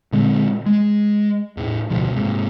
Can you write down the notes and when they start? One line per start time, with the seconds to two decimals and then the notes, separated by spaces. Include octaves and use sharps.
0.13 A#2 D3 G#3 C4
0.66 G#3
1.57 E2 A2
1.90 F1 D2 B2 F3
2.12 G#2 C3